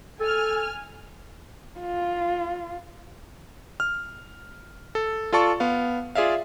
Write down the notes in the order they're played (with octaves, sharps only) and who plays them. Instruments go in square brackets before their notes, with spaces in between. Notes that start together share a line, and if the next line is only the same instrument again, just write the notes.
[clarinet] A4 [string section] G#5 F6
[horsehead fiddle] F4
[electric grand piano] F6
A4
F4 A4 D5 A5 C#6
B3 F5
F4 G#4 D5 E5 F5